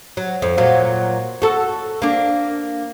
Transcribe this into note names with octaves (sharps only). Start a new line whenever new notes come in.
F#3
F2
A#2 F#3 F4
F#4 A4
A#3 D4